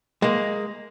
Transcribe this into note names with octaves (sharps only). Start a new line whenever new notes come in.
G#3 A#3